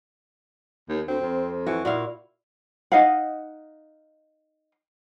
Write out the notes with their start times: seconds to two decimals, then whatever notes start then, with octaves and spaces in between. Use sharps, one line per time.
0.89 D#2
1.08 D2 C4
1.21 F2
1.66 E3 F#4
1.85 A#2 E4 F#4 F5
2.92 D#4 D#5 F5 F#5